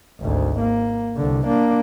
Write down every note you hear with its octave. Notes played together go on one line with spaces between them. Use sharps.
G#1 D2
A#3
C2 D3
A#3 D4